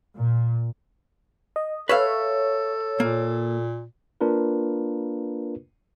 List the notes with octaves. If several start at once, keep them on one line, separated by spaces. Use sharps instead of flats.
A#2
D#5
A4 B4 C#5 E5 F5
A#2 A#3
A#3 D4 F4 A#4 B4